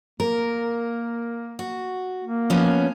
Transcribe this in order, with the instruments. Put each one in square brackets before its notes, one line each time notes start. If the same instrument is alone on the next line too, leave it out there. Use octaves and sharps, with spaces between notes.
[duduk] A#3 [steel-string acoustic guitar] A#4
[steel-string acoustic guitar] F#4
[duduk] A#3
[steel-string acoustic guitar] F3 B3 C#4